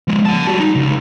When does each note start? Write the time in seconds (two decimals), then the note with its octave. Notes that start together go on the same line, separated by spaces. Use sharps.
0.08 F3 G#3
0.25 F#5 A5
0.47 G3 F#4
0.60 D#4
0.76 C#2